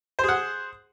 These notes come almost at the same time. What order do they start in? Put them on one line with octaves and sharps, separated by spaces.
C5 G#4 F#5